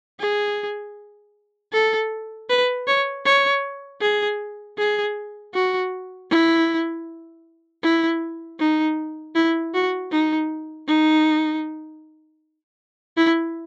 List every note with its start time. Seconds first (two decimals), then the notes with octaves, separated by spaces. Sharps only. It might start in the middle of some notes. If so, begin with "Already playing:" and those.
0.20 G#4
1.73 A4
2.50 B4
2.87 C#5
3.26 C#5
4.02 G#4
4.78 G#4
5.54 F#4
6.31 E4
7.83 E4
8.60 D#4
9.36 E4
9.74 F#4
10.12 D#4
10.88 D#4
13.17 E4